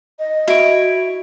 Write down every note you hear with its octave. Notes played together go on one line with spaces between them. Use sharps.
D#5
E4 F#4 C#5 D7